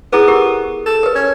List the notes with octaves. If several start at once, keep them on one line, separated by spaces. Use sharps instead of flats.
B3 E4 G#4 B4
G4 A#4
A4
A#4 B4
C#4